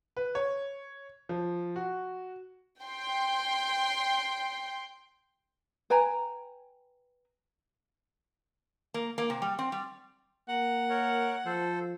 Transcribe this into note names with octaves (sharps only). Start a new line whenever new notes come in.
B4
C#5
F3
F#4
G5 C6
B4 G5 G#5 A#5
A#3
A#3
C3
G3
C4
G3
A#3 F#5 A#5
A#4 C#5
F3 A4 C5